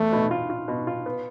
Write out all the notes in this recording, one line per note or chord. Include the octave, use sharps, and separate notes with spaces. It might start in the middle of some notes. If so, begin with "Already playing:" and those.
Already playing: E2 A3
B2
F4
F4
B2
F4
B3